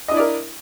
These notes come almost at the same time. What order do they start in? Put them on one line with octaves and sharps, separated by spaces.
D#5 D4 E4 D5 A#4